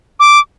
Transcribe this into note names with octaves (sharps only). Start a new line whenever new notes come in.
D6